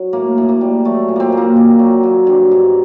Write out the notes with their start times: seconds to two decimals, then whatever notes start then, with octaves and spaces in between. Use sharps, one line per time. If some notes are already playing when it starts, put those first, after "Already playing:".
Already playing: F#3
0.13 A2 A#3
0.38 A2
0.49 A#3
0.61 G3
0.85 F#3 A3
1.09 A#2
1.16 A#3 C4
1.32 A#2
1.37 A#3
1.56 D#3
1.79 F#3
2.03 F#3
2.27 G2
2.51 G2